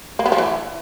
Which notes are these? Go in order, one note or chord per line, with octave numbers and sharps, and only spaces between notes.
A#3
B3
F3
E3